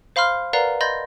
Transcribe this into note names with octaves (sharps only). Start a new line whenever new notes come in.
C5 F5 B5 C6 F6
A#4 B4 D5 F5 F#5 A#5
D#5 B5 C6 G6 A6 A#6